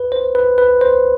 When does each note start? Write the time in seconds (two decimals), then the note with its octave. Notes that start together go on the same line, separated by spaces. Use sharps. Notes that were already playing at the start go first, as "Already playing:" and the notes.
Already playing: B4
0.12 C5
0.35 B4
0.58 B4
0.81 C5